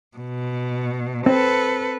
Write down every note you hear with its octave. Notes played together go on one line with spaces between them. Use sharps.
B2
C4 A4 B4